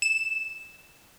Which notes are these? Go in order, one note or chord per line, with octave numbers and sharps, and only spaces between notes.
E7